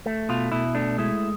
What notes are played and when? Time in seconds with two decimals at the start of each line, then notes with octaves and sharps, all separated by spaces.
0.06 A3
0.29 B2 F4
0.52 B2 E4
0.75 A3 D4
0.98 G#3 E4